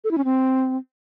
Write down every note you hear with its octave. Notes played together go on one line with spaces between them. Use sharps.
A4
E4
C#4
C4